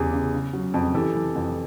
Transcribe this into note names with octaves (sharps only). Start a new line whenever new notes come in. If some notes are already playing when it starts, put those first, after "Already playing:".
Already playing: E2 C#3 G4 G#4
C#3
C#3
F#3
F2
E3 G4 A4
E3
F2